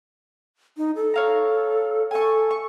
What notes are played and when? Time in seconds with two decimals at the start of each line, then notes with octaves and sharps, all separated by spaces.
0.77 D#4
0.96 A4
1.14 C#5 F5 A#5
2.11 A4 G#5 C#6
2.51 C#6